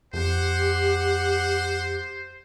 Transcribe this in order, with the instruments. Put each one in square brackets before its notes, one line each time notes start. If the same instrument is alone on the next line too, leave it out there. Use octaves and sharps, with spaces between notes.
[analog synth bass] F2 [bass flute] G4 [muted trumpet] C5 [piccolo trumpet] F#5